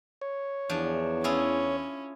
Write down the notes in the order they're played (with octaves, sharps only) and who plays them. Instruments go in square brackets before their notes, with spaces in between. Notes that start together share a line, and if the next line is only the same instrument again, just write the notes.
[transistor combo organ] C#5
[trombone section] E2 [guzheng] F3 D4
[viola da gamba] C#4 [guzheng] E4 F4 G#4